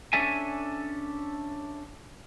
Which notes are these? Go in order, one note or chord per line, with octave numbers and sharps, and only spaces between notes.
C#4 D4 A4 E5 G#5